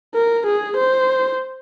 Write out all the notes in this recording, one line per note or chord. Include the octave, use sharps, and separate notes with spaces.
A#4
G#4
C5